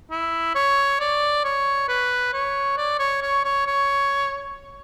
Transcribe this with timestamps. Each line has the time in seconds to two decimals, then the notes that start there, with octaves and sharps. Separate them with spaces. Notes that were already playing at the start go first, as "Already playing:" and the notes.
0.11 E4
0.55 C#5
1.00 D5
1.44 C#5
1.88 B4
2.33 C#5
2.77 D5
2.99 C#5
3.21 C#5
3.44 C#5
3.67 C#5